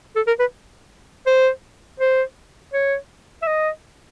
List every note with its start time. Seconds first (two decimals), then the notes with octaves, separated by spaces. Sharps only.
0.16 A4
0.27 A#4
0.40 B4
1.27 C5
2.00 C5
2.74 C#5
3.42 E5
3.47 D#5